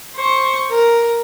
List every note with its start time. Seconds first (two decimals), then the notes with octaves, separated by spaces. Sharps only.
0.16 C5 C#6
0.71 A#4